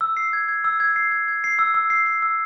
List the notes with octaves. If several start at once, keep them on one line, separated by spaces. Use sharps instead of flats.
E6
C7
G#6
G#6
E6
G#6
C7
G#6
G#6
C7
E6
E6
C7
C7
E6